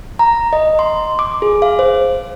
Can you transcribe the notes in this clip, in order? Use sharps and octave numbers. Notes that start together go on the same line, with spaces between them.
A#5
D#5
C6
D6
G#4
F5
C5